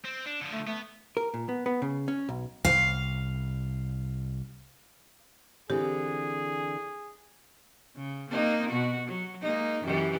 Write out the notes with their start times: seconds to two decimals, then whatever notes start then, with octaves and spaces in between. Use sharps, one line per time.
0.05 C4
0.26 D4
0.41 D3 F3
0.53 A3
0.67 A3 B3
1.17 A#4
1.34 A#2
1.49 B3
1.66 B3
1.82 C#3
2.08 C#4
2.29 B1
2.65 C2 F5
5.70 D3 E3 C4 G4 G#4
7.96 C#3
8.30 A#3 C4 D#4
8.69 B2 F#4
9.07 F#3
9.42 G#3 A#3 D#4
9.82 F#2 E3 G4